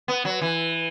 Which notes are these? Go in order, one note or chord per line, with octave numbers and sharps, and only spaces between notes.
B3
F#3
E3